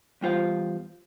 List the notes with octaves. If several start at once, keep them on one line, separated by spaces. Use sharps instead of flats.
E2 G3 F4 C5 F5